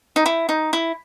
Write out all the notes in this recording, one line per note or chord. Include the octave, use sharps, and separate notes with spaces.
D#4
E4
D#4
E4